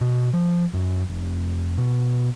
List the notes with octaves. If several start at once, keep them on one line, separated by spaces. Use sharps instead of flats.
B2
F3
F#2
F1
B2